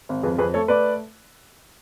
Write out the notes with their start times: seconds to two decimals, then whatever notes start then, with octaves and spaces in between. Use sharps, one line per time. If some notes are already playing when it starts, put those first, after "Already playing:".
0.09 G#1
0.23 F2 G#4 B4
0.38 F2 G#4 B4
0.54 A3 A4 C#5
0.68 A3 B4 D5